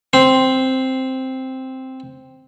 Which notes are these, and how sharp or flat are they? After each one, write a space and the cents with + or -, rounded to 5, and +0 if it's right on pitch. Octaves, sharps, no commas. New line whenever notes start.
C4 +0 C6 +0